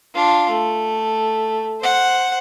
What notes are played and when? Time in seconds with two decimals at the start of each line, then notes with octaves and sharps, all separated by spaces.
0.15 D4 F4
0.49 A3
1.80 C5 F#5